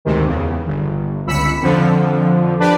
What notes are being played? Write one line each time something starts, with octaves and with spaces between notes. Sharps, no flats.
D2 G#2 C3 D#3
E2 C#3
G1
G1 C#2 B5 E6 B6 C#7
F2 D3 F3
D4 G4 B4 D5